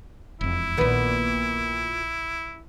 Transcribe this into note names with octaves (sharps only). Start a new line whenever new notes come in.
E1 F2 E4
A#1 A#2 D#3 B3